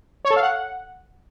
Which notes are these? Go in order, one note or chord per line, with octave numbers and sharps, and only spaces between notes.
C#5
A4
F5
F#5